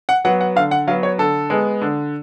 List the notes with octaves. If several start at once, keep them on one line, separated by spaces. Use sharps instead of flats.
F#5
F#3 B3 F#5
F#5
D3 F5
F#5
F#3 B3 F5
C#5
D3 A4
G#3 B3
D3